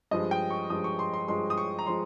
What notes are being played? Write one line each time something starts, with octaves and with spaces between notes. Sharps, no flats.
G2 F3 G#3 D#5
G5
C#6
G2 F3 G#3 D#6
C#6
C6
C6
G2 F3 G#3 C6
D#6
C#6
A#5
F3 G#3 C6